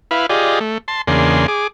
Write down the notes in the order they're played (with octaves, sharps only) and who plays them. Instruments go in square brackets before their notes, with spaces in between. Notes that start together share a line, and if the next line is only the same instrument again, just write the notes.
[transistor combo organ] E4 B4 F5
F4 G4 G#4 D5 D#5
A3
A5 C6
E2 C#3 A#3 D4 G#4 C6
G#4 D6